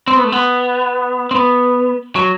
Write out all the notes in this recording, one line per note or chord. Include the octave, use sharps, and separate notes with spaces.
C4
B3
A3
B3
C4
B3
F#3